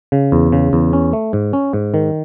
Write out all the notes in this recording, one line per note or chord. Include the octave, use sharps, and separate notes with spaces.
C#3
E2
C#3
E2
C#4
A3
G#2
C#4
G#2
D#3